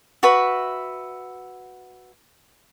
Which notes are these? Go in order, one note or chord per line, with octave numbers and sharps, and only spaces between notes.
F#4 B4 E5